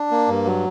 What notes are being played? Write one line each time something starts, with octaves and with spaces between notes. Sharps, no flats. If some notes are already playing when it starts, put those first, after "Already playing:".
Already playing: D4
A#3
G2
F#3